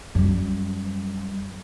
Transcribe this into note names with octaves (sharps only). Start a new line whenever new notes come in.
F#2 G3